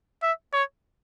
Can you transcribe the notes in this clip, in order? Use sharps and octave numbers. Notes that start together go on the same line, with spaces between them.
E5
C#5